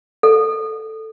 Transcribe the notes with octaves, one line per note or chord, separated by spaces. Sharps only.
A4